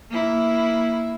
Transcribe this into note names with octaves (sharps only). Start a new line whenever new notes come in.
A#3 E4